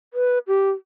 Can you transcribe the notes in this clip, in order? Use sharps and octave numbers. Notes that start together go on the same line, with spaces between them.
B4
G4